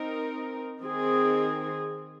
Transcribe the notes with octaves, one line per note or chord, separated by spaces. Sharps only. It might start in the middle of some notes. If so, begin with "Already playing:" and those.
Already playing: C4 D#4 A#4
D#3 C4 G#4